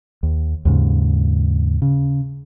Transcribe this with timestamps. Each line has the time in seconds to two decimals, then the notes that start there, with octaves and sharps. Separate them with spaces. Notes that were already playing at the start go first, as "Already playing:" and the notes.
0.23 D#2
0.65 D#2 G#2 C#3
1.82 C#3